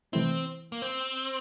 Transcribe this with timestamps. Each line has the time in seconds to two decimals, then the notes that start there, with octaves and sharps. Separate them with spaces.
0.13 C3 E3 A3 C4 E4
0.72 A#3
0.82 C4